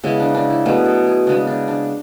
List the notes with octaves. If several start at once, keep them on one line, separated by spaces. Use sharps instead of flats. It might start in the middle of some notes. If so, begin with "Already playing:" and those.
C#3 G#3 B3 E4
D4
D4
E4
B2 F#3 A3 G#4
A4
G#4
C#3 G#3 B3 D4
D4
D4